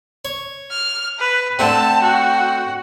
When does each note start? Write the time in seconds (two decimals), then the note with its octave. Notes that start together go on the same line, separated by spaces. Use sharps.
0.25 C#5
0.70 F6
1.19 B4
1.59 D3 A3 C4 G5 A5
2.03 F#4